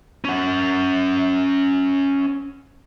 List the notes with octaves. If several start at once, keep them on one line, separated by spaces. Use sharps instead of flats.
C#4 F#5